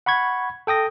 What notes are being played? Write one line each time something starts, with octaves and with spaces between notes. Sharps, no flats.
F#5 B5 C#6 G#6
A4 G5 D#6 A#6